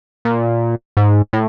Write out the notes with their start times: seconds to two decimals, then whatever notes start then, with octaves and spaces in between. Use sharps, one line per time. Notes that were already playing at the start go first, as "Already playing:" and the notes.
0.25 A#2
0.97 G#2
1.33 A2